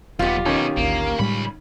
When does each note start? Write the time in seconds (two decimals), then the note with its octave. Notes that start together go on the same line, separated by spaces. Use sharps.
0.19 D#1 B1 B3 F4 G4
0.46 B2 D#3 C#4 D#4
0.77 G#1 D2 A#3
1.19 C#2 A2 G3 G#3 B5